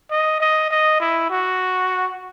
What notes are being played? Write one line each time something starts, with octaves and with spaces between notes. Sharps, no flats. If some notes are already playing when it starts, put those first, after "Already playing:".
D#5
D#5
D#5
E4
F#4